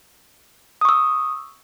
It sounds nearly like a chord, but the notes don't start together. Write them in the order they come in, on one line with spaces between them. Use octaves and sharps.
D#6 C#6 E6